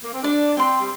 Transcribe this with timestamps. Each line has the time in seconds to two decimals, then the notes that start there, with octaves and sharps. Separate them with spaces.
0.04 A#3
0.14 C4
0.23 D4 D5
0.57 C4 G5 C6
0.79 G3